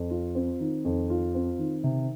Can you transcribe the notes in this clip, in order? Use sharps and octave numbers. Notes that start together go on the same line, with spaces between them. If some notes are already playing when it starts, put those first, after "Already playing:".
Already playing: F2
F4
C4
D#3
F2
F4
C4
D#3
C3